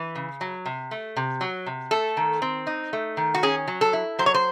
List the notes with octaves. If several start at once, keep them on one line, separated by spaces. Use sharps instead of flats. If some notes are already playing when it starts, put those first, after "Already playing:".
Already playing: E3
C#3
F#3
C3
A3
C3
F#3
C3
A3 A4
D#3
C4
D#4
A3
D#3
F#4
C#4 G#4
F#3
A4
E4
F#3 C5
C#5
C5